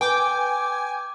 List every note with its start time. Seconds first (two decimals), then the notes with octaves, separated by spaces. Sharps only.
0.01 B4 G5 G#5 D6 G6